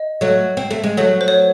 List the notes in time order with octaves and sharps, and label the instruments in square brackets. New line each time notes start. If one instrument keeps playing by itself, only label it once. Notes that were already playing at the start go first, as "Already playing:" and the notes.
Already playing: [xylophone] D#5
[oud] F#3 A3
C4
A3
G#3
F#3 A3
[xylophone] C5
C#5